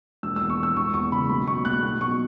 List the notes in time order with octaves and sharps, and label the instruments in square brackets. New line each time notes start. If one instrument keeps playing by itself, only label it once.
[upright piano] E1 E6
E6
E2
C#6
E3 E6
E1 C#6
E2 C#6
C#3 B5
B1 B5
B2 C#6
B1 F#6
B1 F#6
B2 C#6